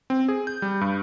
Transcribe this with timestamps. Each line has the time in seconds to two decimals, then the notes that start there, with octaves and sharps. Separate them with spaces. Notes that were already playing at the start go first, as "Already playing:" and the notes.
0.10 C4
0.28 G#4
0.47 G6
0.62 G3
0.81 G2